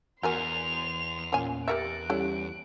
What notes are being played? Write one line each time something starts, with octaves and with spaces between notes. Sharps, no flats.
E2 F#4 A#4 G#5 C6 F7
A#2 A#3 C#4 G#5
G4 A#4 E5 F#6 A6 A#6 C#7 D7
G3 C#4 E4 A4